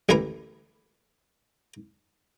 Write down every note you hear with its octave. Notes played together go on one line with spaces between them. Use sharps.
A1 D2 E3 A#4 B5 D6